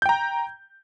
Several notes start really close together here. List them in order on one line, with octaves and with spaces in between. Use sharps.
G6 G5 A#5